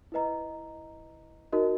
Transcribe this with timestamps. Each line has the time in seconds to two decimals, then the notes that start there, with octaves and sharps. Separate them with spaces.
0.12 E4 B4 D#5 A#5
1.52 D#4 F#4 A#4 D#5